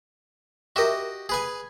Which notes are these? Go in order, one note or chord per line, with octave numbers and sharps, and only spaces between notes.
F#4 G4 A#4 D#5 E5
G#4 B4 G#5